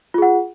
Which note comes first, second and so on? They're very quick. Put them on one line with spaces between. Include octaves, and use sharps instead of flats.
F4 G#4 F#5